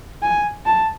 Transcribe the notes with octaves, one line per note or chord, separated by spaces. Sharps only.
G#5
A5